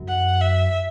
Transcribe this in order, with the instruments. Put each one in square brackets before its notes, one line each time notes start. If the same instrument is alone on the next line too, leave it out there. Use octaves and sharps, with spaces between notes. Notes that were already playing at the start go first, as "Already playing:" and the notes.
Already playing: [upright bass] F#2
[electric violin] F#5
E5